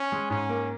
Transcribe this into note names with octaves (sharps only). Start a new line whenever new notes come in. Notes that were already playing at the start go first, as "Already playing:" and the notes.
Already playing: C#4
G#3
G#2 C#4
A#3